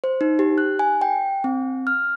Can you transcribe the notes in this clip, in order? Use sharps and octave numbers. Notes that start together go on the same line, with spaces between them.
C5
D#4
G4
F#6
G#5
G5
C4
F6